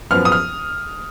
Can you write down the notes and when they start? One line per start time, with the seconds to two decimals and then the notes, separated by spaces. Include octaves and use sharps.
0.11 F#2 F3 B3 F6
0.25 D#6
0.32 F6